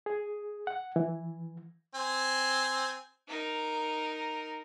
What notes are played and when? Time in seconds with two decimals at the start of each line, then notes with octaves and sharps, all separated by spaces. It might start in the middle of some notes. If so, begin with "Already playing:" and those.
0.06 G#4
0.67 F#5
0.96 E3
1.95 C4 G#5
3.28 D#4 A#4